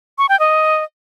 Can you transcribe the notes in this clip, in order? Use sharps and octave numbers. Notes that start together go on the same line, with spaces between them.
C#6
G5
D#5